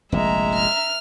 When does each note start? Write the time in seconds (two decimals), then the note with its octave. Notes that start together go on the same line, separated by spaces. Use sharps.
0.12 F1 A#1 G#3 E5 A#5
0.54 F6